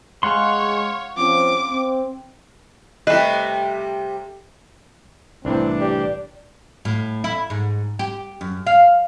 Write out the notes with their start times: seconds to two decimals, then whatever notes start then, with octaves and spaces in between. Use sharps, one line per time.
0.23 G#3 C#5 F5 F#5 C6
1.17 F3 C4 C#4 D6
1.69 C4
3.07 C3 G3 A3 B4 D#5
5.45 C2 A2 E3 C4 D4
5.81 G4 D5
6.85 A2
7.24 E4
7.50 G#2
7.99 G4
8.41 F#2
8.67 F5